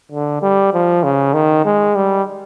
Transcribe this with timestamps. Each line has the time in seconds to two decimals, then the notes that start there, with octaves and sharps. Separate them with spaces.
0.12 D3
0.42 G3
0.73 F3
1.04 C#3
1.34 D#3
1.65 G#3
1.96 G3